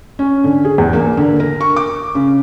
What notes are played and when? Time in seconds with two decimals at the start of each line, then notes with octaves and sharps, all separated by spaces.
0.19 C#4
0.44 D3
0.65 G#4
0.78 E2
0.93 A#3
1.17 D3
1.40 A#4
1.61 C#6
1.76 D6
2.15 C#3